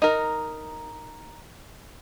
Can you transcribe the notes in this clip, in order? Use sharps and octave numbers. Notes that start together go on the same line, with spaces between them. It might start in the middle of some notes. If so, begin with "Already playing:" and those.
D#4 A#4